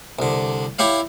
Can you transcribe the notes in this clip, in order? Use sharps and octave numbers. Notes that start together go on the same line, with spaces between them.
C2 D3
E4 G4 C#5 F5